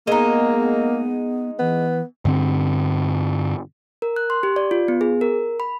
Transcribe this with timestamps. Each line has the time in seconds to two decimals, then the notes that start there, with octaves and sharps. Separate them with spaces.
0.07 G#3 A#3 B3 D#4
1.59 E3 B3
2.25 G2 D3 C4
4.02 A#4
4.16 F#6
4.30 C6
4.43 G4
4.56 D5
4.71 F4
4.88 B3
5.01 G#4
5.21 A#4
5.60 B5